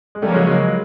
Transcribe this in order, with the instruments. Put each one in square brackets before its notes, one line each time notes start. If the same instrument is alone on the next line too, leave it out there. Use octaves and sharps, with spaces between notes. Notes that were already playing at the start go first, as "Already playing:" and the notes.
[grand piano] G#3
[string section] C#3 F3 A#3 C#4 [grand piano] G3 A3
[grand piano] F#3 G#3
F#3 G#3